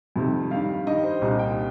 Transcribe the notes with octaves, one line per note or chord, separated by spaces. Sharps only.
F2 C3 D#3 G3
G2 D#3 G3 F5
G2 D#3 G3 D#5
C5
C2 A#2 G3 D#5
G5